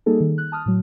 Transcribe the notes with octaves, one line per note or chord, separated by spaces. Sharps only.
G3 A#3 D#4 G#4 A4
D#3
F#6
A5 D#6 F6
A2 F#3